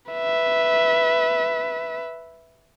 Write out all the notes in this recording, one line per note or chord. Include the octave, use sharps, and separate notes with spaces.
B4 E5